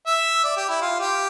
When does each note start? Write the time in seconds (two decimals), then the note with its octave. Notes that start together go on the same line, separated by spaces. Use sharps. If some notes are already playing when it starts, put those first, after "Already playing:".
0.06 E5
0.44 D5
0.57 G4
0.69 E4
0.81 F4
1.00 G4